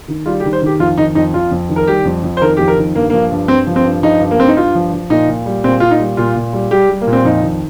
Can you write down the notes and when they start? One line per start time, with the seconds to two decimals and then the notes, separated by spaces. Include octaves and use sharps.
0.08 D#3
0.26 G3 F4
0.40 G4
0.45 D#3
0.53 C5
0.62 D#3 G4
0.79 F2 F4
0.98 D#3 D#4
1.15 F2 D#4
1.34 F2 F4
1.51 F2
1.69 D#3
1.76 A#4
1.87 G3 G4
2.05 F2
2.23 F2
2.37 C5
2.41 D#3 A#4
2.57 F2 G4
2.68 A#4
2.78 D#3
2.95 G2 A#3
3.10 F3 A#3
3.31 G2
3.48 G2 C4
3.67 F3
3.76 C4
3.84 G2
4.03 F3 D#4
4.20 G2
4.31 A#3
4.38 G2 C4
4.48 D#4
4.56 G2 F4
4.75 F3
4.93 F3
5.10 A#2 D#4
5.28 A#2
5.46 G3
5.64 A#2 C4
5.80 A#2 F4
5.91 D#4
6.00 G3
6.17 A#2 F4
6.35 A#2
6.53 G3
6.71 G3 G4
6.89 G3
7.01 A#3
7.07 A#2
7.13 C4
7.25 F2 D#4
7.43 D#3